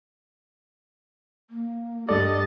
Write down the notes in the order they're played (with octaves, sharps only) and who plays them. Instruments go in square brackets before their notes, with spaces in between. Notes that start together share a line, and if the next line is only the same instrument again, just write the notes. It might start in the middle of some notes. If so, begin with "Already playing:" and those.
[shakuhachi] A#3
[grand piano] G2 A4 [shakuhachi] G4 [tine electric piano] D5 [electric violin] D#5 A6